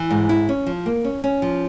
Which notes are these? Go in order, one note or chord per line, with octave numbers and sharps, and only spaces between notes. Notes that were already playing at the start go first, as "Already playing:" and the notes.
Already playing: E3
G#2
E4
C#4
F3
A#3
C#4
C#4
F3